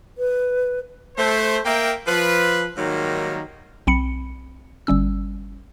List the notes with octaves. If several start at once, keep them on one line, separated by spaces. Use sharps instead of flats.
B4
A3 C5
A#3 A#4 E5 G5
F3 B4
G#2 D#3 F#3 G3 A#3
B1 C4 B5 C#7
G1 G3 C#4 E6